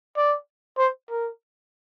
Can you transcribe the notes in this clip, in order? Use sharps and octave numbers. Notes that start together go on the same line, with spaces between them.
D5
C5
A#4